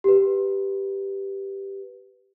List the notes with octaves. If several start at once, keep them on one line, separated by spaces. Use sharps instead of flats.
G4 B4